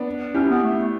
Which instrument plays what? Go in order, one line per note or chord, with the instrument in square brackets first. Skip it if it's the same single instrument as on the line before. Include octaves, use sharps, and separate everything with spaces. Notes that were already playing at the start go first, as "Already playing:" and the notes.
Already playing: [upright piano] B3 D4
[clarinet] C#4 [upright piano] E4 G4
[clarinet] B3
A3